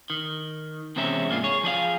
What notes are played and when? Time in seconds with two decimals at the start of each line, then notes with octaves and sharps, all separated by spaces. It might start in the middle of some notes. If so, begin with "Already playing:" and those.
0.10 D#3
0.96 E2 C3 G#3 C4 C#4 E5
1.29 G#2 A#3 D4 F4
1.44 G#4 C#5
1.63 F3 G#4 D5 F5